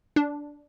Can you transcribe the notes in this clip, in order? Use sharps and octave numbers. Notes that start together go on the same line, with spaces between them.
D4